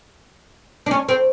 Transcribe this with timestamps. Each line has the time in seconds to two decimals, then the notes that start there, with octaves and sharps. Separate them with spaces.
0.86 D4
0.91 C#4
1.09 C4